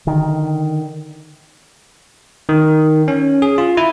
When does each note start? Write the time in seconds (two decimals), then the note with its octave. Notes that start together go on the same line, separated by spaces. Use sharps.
0.07 D3 D#3
2.49 D#3
3.08 C#4
3.42 G#4
3.58 F4
3.77 E4